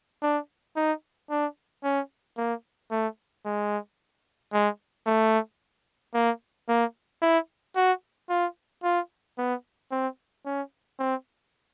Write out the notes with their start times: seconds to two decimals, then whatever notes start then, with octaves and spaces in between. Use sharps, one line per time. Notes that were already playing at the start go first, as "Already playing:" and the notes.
0.22 D4
0.76 D#4
1.30 D4
1.84 C#4
2.38 A#3
2.91 A3
3.45 G#3
4.53 G#3
5.07 A3
6.14 A#3
6.68 A#3
7.22 E4
7.76 F#4
8.30 F4
8.83 F4
9.38 B3
9.91 C4
10.45 C#4
10.99 C4